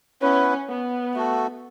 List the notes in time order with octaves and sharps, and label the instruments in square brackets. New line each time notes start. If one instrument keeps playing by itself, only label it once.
[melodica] B3 E4 B4 [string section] C#4
[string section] B3
[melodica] A3 F#4 A4